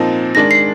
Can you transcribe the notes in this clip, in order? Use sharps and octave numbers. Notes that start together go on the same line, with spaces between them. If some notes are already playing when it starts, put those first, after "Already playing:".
Already playing: A#2 F3 C4 D#4
D#3 G#3 D4 A#6
C7